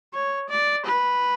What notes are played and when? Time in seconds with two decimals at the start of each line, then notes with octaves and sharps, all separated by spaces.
0.13 C#5
0.50 D5
0.86 B4